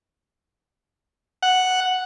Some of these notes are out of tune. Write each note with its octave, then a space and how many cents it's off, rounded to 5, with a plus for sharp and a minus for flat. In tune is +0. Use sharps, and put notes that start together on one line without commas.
F#5 +0